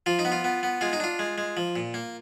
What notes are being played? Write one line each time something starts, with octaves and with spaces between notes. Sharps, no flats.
F3 F4
D#4
B3
F4
B3
B3
G#3 F4
D#4
D4 F4
G#3
G#3
F3
A#2
A#3